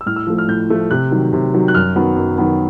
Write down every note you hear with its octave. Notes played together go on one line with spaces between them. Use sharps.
E6
A2 F6
E6
F3 A3
F6
A2 G6
F3 A3
C3 F#6
D#3 F#3
C3
D#3 F#3
F#6
F#2 F6
D#3 F#3 B3
F#2
D#3 F#3 B3